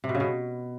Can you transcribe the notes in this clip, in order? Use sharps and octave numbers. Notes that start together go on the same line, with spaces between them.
C3
B2
C#3
B2